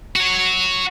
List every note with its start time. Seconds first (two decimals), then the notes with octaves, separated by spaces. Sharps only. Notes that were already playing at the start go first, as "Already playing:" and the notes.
0.16 F#4 C#5